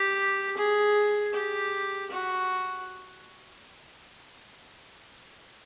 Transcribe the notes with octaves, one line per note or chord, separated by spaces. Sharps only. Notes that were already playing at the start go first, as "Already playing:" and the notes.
Already playing: G4
G#4
G4
F#4